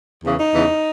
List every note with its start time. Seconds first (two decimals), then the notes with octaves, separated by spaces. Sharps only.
0.24 E2 C#3 E3
0.38 D#4
0.54 E2 C#3 E3